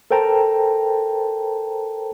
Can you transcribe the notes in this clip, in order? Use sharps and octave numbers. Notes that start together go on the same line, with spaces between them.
A4 A#4 C5 G5 A5 A#5